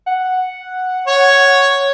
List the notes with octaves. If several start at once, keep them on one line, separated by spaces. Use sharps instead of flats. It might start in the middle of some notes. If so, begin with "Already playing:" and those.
F#5
C#5